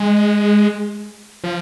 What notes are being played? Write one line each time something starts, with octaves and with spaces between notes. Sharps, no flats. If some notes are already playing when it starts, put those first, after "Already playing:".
Already playing: G#3
F3